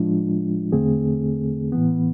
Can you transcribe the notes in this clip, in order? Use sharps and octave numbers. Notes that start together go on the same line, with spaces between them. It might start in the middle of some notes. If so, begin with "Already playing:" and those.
Already playing: A2 F3 G#3 D4 F4
E2 D3 A3 C4 G#4
A2 E3 B3